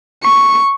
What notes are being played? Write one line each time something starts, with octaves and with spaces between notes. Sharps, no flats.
C#6